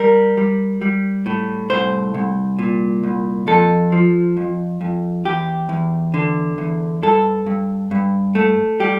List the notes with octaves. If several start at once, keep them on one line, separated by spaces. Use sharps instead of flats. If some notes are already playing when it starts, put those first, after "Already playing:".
Already playing: G3 A#4
G3
G3
A2
C2 C5
C2
A#2
C2
F2 A4
F3
F2
F2
E2 G4
E2
D3
E2
G2 A4
G2
G2
A3
G3 G4